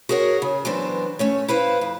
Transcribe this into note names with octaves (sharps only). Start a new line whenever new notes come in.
F#4 G#4 A#4 C#5 F#5
C#3
E3 F#3 B3 C4 D4
A3 C#4 C#5
E4 B4 C5 F5
F2